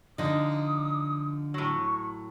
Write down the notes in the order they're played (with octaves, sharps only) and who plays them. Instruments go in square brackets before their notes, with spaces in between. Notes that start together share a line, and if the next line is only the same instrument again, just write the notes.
[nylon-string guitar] D3 F3 [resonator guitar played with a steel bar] D#4 [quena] D#6
[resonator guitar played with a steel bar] A2 F#3 [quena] C#6